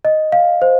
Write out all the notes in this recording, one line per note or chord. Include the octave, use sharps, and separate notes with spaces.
D#5
F5
C5